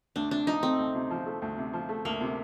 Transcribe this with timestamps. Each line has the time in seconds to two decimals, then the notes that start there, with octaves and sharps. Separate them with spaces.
0.16 D2 D4
0.31 C3 D4
0.47 F3 D#4
0.63 A3 C4
0.79 D2
0.95 C3
1.11 F3
1.26 A3
1.42 D2
1.57 C3
1.73 F3
1.89 A3
2.05 D2 A#3
2.21 C3